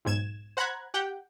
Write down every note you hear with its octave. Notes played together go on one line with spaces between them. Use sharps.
B1 G#2 G#6 E7
C5 F#5 A#5 B5 F#6 G#6
G4 F#5 G5